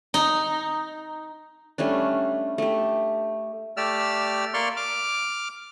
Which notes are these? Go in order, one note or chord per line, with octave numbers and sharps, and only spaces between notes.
D#4
G3 A3 C#4 D4
A3 G4
A3 G4 D5 E6 F6
A#3 D5 C6 C#6 F6
D6 F6